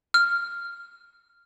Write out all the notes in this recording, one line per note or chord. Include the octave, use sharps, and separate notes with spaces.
F6